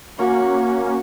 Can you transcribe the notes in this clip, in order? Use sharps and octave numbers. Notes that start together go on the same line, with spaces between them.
A#3 C#4 F#4